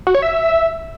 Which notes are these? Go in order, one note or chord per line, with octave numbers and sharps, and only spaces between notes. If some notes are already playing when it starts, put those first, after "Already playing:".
F#4
C#5
E5